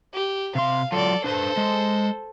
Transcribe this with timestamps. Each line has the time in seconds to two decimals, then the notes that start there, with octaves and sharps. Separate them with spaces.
0.14 G4
0.55 C3 F5 C6
0.92 F#3 F4 A4 D5
1.24 D4 A4 B4 C5
1.57 G#3